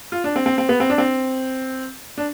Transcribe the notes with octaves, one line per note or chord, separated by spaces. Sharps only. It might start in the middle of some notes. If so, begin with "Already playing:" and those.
F4
D4
C4
C4
C4
B3
C4
D4
C4
D4